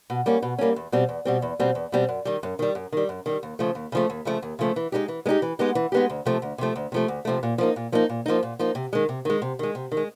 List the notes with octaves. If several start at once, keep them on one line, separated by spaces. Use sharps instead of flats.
B2
G3 A#3 C#4
B2
G3 A#3 C#4
E2
B2 G3 C4
E2
B2 G3 C4
E2
B2 G3 C4
E2
B2 G3 C4
F#2
D#3 G3
F#2
D#3 G3
F#2
D#3 G3
F#2
D#3 G3
D#2
C#3 F3 A3
D#2
C#3 F3 A3
D#2
C#3 F3 A3
D#2
C#3 F3 A3
E3
G#3 B3 D#4 G4
E3
G#3 B3 D#4 G4
E3
G#3 B3 D#4 G4
E3
G#3 B3 D#4 G4
D2
C3 F3 A3
D2
C3 F3 A3
D2
C3 F3 A3
D2
C3 F3 A3
A#2
F3 A#3 D#4
A#2
F3 A#3 D#4
A#2
F3 A#3 D#4
A#2
F3 A#3 D#4
C3
D#3 G#3
C3
D#3 G#3
C3
D#3 G#3
C3
D#3
G#3